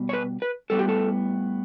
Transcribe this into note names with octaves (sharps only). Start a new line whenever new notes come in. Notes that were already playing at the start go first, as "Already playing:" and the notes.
Already playing: B2 G3 B3
C#5
B4
B4
A2 G3 B3 A4
G4
A4